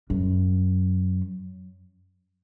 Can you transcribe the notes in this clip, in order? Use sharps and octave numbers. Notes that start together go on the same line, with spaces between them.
F#2